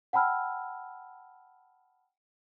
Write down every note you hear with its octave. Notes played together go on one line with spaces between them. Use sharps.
F#5 G5 A5 B5 E6 F6